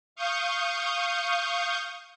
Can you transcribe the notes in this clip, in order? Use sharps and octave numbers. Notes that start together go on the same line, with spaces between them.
F5 C#6 D#6 G6